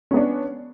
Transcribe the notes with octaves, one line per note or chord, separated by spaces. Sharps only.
B3 C#4 D4